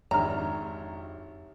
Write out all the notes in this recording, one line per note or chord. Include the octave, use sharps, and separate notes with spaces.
G#1 F2 D4 G4 C#5 E5 A#5 F6